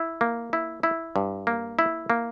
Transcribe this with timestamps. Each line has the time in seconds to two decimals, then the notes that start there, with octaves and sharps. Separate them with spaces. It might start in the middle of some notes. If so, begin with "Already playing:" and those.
Already playing: E4
0.21 A#3
0.53 E4
0.83 E4
1.16 G2
1.47 A#3
1.79 E4
2.10 A#3